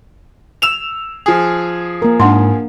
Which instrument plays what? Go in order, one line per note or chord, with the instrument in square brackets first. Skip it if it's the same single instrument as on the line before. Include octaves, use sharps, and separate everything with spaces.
[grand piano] E6 E7 F7
F3 G#4
[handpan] A#3 A#4
[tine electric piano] G#2 [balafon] D4 F#5 C6